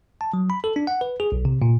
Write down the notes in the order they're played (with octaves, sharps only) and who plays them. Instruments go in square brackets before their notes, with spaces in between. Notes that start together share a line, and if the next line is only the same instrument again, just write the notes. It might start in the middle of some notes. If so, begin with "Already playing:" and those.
[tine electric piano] A5
F#3
B5
A4
D4
F#5
B4
G#4
B1
C3
A#2